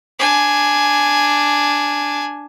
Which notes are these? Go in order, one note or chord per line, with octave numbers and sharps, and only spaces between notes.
D4 G#5